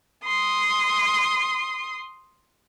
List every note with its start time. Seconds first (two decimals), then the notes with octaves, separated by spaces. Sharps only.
0.24 C6 D#6